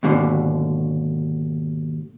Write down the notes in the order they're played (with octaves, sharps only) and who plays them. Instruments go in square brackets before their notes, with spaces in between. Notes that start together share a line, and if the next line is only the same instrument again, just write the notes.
[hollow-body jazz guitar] D#2 G#2 B2 D3